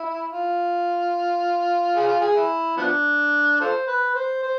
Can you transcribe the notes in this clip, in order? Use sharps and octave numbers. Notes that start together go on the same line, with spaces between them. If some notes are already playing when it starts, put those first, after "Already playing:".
Already playing: E4
F4
G#4
F4
G#4
E4
F3 B3 D4
F4 A4 C5
B4
C5
C5